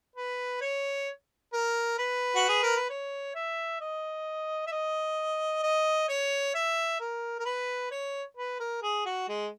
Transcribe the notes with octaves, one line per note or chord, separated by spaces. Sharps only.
B4
C#5
A#4
B4
F#4
G#4
A#4
B4
C#5
E5
D#5
E5
D#5
D#5
C#5
E5
A#4
A#4
B4
C#5
B4
A#4
G#4
F#4
G#3